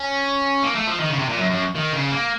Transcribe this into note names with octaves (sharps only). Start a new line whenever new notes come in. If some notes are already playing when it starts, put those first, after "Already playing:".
Already playing: C#4
A#3
A3
F3
D#3
C#3
C3
A#2
F#2
F#2
D#3
C#3
A#3